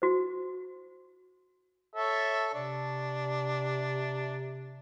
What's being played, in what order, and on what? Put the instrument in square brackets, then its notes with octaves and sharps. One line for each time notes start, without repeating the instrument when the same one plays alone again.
[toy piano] F#4 C5
[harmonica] A4 C#5 E5
[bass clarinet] C3 [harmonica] D4